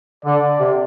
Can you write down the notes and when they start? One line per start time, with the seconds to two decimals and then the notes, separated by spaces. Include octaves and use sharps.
0.25 D3 D5
0.59 C3